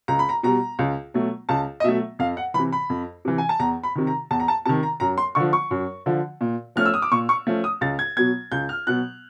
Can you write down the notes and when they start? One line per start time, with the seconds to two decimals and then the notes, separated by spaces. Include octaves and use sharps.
0.08 C#2 A#5
0.19 B5
0.29 A#5
0.43 B2 G3 A#5
0.79 C#2
1.14 B2 F#3 A3
1.49 C#2 A5
1.80 D#5
1.84 B2 F#3 A3 E5
2.19 F2 F5
2.37 F#5
2.54 E3 B5
2.59 C3
2.73 B5
2.90 F2
3.25 C3 E3
3.38 G#5
3.49 A5
3.60 E2 A#5
3.83 B5
3.95 C3 D#3
4.07 A#5
4.31 E2 A5
4.40 A#5
4.48 A5
4.65 C3 D#3 A5
4.83 A#5
5.00 F#2 A#5
5.18 C6
5.35 D3 F3 C#6
5.53 C#6
5.71 F#2
6.06 D3 F3
6.41 A#2
6.76 F3 A3 C#4 F6
6.86 E6
6.94 D#6
7.02 D6
7.12 A#2 C#6
7.29 C#6
7.47 F3 A3 C#4
7.64 D#6
7.81 C#2 A6
7.99 G#6
8.17 B2 F#3 B3 G#6
8.52 C#2 G6
8.69 F6
8.87 B2 F#3 B3 F#6